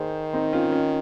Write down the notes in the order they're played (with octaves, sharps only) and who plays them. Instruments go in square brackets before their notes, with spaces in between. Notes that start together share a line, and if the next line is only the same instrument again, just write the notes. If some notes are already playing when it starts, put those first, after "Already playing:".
Already playing: [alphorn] D#3 [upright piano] G#4 C5
[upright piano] C4 D#4
C#4 F4
C#4 F4